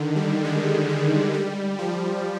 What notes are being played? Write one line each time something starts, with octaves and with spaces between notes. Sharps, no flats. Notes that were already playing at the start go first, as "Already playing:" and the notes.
Already playing: D3 D#3
G3
G#3
G#3
G3
F3